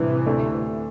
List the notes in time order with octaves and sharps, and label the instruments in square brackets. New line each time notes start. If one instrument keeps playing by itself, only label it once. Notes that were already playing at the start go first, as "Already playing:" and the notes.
Already playing: [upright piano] A2 G3 D4 [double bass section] C3 E3
[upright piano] D2 D3 A3 D4